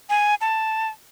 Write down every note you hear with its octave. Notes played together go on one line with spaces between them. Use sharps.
G#5
A5